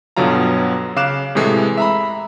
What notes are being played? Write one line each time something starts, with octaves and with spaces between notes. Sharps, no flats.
G1 B2 D3 F#3 F4 A#5
C#3 F5 D6 F#6 E7
A2 C3 E3 G#3 A3
E5 A#5 B5